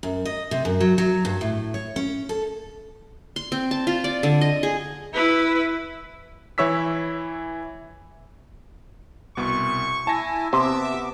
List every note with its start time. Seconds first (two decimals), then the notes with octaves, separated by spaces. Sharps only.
0.03 F#2
0.25 D#5
0.51 C3
0.65 F#2
0.80 F#3
0.98 F#3
1.25 G2
1.41 A2
1.74 C#5
1.96 C#4
2.29 A4
3.36 C6
3.52 C4
3.71 A5
3.87 F4
4.04 D5
4.23 D3
4.41 D#5
4.63 G#4
5.14 E4 B4
6.58 E3 E4 C#5 E6 B6
9.37 C2 B2 B3 C#6
10.07 E4 E5 G#5 A5 A#6
10.53 C3 B3 C5 E5 D6